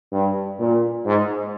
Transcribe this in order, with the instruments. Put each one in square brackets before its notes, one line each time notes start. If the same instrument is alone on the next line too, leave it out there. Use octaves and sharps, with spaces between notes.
[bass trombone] G2
A#2
G#2